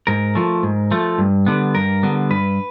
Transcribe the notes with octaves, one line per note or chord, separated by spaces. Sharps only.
G#2 A#4
F3 A3
G#2
F3 A3
G2
D3 G3 B3
G2 A#4
D3 G3 B3
G2 B4